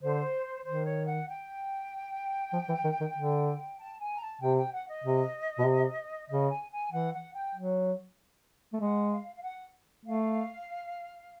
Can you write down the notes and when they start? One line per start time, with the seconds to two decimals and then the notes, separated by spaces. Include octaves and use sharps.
0.02 D3 C5
0.65 D#3 C5
0.86 C#5
1.06 F#5
1.28 G5
2.53 F3
2.68 E3
2.84 D#3
3.00 D#3
3.15 D3
3.78 A5
4.00 G#5
4.16 A#5
4.21 A5
4.41 C3 G5
4.57 G5
4.72 F#5
4.88 D#5
5.04 C3
5.58 B2
5.66 C3
6.29 C#3 D#5
6.50 G#5
6.71 G#5
6.91 E3 F#5
7.13 F#5
7.34 G5
7.55 F#3
8.73 A3
8.80 G#3 F#5
9.11 F5
9.36 F5
9.42 F#5
10.05 A3 F5